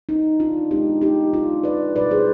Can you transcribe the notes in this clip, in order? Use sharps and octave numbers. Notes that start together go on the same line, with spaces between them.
D#4
D4 F4
B2 G#3 B3 D4 D#4 G4
D#4 G4
D4 F4
B4 D5
B2 G3 D4 B4 D5
G#4 C5